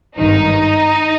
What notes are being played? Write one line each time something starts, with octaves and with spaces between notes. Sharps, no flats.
G#1 G2 D#3 D#4